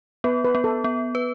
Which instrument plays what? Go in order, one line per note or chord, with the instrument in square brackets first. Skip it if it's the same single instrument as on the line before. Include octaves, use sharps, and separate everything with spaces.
[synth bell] B3 [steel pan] B4
[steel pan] B4
[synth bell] B3
[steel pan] A4
[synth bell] B3
B4